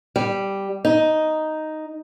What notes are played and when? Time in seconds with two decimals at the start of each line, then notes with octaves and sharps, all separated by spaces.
0.16 G3
0.85 D#4